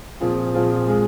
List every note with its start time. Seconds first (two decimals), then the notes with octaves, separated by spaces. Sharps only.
0.20 A#2 F3 C4 F4 G#4
0.54 A#2 F3 C4 F4 G#4
0.87 G#3 F4 G#4